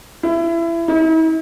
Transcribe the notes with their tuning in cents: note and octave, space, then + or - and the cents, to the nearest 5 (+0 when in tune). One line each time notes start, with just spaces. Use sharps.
E4 +25
E4 -45